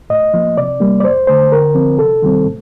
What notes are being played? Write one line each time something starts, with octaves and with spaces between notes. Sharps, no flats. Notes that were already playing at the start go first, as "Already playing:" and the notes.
A2 D#5
F3 A#3
C3 D5
G3 A#3
D5
F2 C5
D3 A3 C5
D3 A#4
F3 C4
C3 A4
D#3 G3 C4
A2